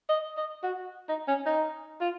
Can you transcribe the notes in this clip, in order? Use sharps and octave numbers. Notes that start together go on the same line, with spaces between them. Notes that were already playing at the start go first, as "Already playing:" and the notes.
D#5
D#5
F#4
D#4
C#4
D#4
F4